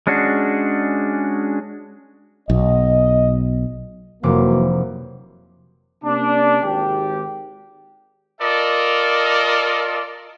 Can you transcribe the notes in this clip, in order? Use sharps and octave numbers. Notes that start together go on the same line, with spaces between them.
G#3 C#4 D4 F#4 G#4
B1 D#5
F1 C3 E3 F#3 A#3 D6
C3 A#3 C#4 D4
G#1 G4
F4 A4 A#4 D5 D#5